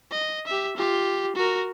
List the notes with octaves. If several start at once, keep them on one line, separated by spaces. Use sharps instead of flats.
D#5
G4 E5
F4 G4
F#4 A#4